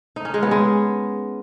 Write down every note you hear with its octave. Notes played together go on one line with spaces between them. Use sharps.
D#4
C#4
G#3
B3
G#3